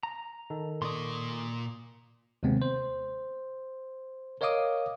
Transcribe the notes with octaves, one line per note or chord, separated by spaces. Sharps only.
A#5
D#3 A4 A#4
A#2 D5 C6 C#6 D#6
D#2 C3 G#3 B3 C4
C5
A#4 C#5 D#5 F5 D6 D#6